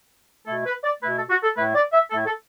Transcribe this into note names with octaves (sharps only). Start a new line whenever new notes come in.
B2 A3 E4 A4
B4
D5
B2 A3 E4 B4
A4
F#4
A4
A2 A3 E4 B4
D5
E5
A2 A3 E4 A4
A4